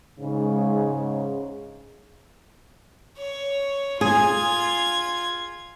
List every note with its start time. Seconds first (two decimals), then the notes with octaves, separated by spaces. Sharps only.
0.19 G#2 C#3
3.18 C#5
4.01 F4 G#4 G#6